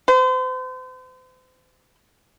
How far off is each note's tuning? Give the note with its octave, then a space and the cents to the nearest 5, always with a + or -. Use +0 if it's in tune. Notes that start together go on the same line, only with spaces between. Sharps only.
C5 -40